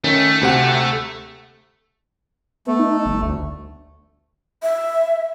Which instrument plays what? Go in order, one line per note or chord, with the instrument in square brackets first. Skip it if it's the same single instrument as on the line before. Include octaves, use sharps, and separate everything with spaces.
[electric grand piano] D#3 C#4 [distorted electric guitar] A3
[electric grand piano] D2 C3 F#5
[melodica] A3 [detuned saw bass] B3
[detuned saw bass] D#4
G1
D2
[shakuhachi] E5